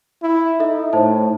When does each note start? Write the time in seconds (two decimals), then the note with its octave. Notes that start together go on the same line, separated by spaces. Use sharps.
0.22 E4
0.60 D#4 A4 E5
0.93 A2 D#4 C5 A5